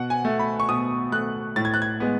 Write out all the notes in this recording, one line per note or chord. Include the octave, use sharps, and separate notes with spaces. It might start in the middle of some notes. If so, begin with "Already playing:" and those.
Already playing: B2 F#5
G#5
A3
B5
C#6
B2 D#6
A3 F#6
A2 A6
G#6
F#6
G#6
G#3 B3